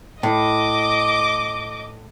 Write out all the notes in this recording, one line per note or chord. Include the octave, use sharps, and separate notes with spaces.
A2 D#5 D6